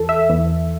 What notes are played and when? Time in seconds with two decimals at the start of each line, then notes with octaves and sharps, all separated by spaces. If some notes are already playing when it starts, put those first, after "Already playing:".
Already playing: E2 E3 A4
0.09 E5
0.29 E2 E3